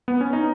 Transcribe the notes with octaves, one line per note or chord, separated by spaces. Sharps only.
B3
C#4
D#4